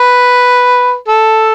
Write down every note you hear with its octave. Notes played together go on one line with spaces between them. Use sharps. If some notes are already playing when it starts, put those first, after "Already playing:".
Already playing: B4
A4